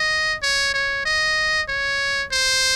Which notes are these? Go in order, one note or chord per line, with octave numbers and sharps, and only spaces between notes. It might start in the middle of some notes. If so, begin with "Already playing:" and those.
Already playing: D#5
C#5
C#5
D#5
C#5
C5